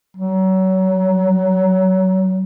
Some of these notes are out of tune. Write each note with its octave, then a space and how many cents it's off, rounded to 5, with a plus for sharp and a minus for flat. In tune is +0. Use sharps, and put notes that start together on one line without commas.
F#3 +25